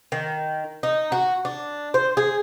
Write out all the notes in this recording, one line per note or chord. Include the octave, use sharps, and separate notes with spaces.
D#3
D#4
F#4
D4
C5
G#4